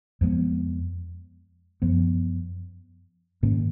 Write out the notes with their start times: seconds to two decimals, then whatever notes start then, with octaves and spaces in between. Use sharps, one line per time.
0.21 F2 F3 G#3 B3
1.82 F#2 F3 B3
3.43 G#2 D#3 A#3 C#4